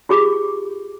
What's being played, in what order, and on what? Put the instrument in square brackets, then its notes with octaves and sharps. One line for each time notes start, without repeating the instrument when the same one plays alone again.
[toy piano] F4 G4 G#4 D6